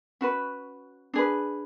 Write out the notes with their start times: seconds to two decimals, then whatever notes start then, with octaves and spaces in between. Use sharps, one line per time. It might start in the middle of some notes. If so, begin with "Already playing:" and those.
0.21 C#4 F#4 B4
1.14 D4 G#4 B4